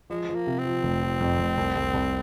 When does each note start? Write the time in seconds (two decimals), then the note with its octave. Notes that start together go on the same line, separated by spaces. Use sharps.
0.10 F3 G#3
0.29 F3
0.35 A#3
0.47 C3
0.59 C4
0.65 F3
0.83 F1
1.02 F3
1.20 F2
1.39 F1
1.57 C2
1.76 C2
1.94 C2